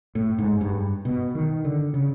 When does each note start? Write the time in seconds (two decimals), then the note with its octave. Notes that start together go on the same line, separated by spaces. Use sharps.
0.15 A2
0.38 G#2
0.61 G2
1.05 B2
1.35 D#3
1.65 D3
1.94 C#3